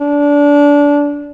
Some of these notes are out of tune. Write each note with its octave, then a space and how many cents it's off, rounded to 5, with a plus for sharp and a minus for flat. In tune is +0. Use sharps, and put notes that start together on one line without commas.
D4 -25